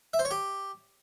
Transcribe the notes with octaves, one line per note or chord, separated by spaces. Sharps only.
E5
C5
C#5
G4